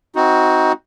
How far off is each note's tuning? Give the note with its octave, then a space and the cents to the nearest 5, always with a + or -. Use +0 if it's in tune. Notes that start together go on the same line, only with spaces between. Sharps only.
C4 +0 D#4 +20 F#4 +0